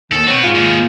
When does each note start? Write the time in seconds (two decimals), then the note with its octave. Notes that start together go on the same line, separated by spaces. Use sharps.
0.12 D#2 D#3 A4
0.27 C4 F#4 B4 C#5
0.44 G#2 F4
0.55 A#2 D#3